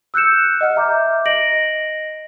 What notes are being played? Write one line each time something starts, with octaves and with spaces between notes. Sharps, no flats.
E6 F#6 G6 C#7 E7
D#5 F#5 F6
E5 A#5 D6 G6
D#5 A#6 D7 F#7